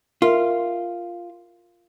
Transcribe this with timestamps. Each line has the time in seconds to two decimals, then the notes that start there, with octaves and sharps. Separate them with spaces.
0.22 F4 A#4 E5